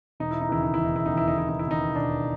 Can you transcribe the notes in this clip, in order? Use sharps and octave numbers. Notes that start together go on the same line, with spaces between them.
E1 D#4
E4
D#4
D#2 C#3 E3 E4
D#4
E1 E4
D#4
E4
D#2 C#3 E3 D#4
E4
D#4
E1 E4
D#4
E4
D#2 C#3 E3 D#4
E1 D4